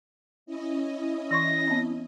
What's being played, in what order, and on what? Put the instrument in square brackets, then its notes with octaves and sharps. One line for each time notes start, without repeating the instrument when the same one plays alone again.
[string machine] C#4 E4 D#5
[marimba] E3 C6 C#6 [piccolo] A#6
[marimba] B3 C4